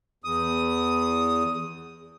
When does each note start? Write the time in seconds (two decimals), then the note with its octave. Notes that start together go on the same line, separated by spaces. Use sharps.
0.24 E2 D#6